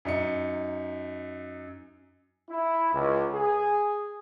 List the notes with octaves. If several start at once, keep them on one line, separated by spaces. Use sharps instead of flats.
F#2 D#4 C#7
E4
C#2
G#4